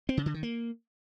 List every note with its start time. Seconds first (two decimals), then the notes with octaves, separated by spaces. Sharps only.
0.09 C4
0.17 C#3
0.26 D3
0.34 D#3
0.43 A#3